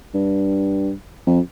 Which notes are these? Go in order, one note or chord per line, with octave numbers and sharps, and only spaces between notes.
G2
F2